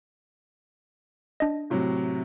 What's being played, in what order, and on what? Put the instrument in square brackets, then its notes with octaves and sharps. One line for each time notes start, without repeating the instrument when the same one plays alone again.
[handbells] D4 D#5
[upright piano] A2 C3 F#3